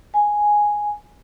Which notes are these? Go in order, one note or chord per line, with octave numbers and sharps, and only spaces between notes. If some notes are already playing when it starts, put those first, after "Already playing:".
G#5